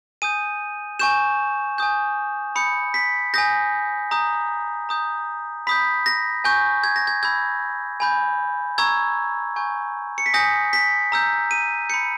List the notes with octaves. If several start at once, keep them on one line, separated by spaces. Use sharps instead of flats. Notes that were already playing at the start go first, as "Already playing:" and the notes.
G#5 D#6 G6 D#7
G#5 C#6 G6 E7
G#5 D#6 G6
B5 D#6 G6 C#7
B6
G#5 D#6 G6 A#6
A#5 D#6 G6
A#5 D#6 G6
B5 D#6 G6 B6
A#6
G#5 C#6 G6
G#6
A#6
G#6
B5 E6 G6 G#6
G#5 B5 G6
A#5 C#6 E6 G#6
G#5 C#6 G6
C#7
B6
G#5 D#6 G6 A#6
B6
A#5 E6 G6
D#7
B5 G6 C#7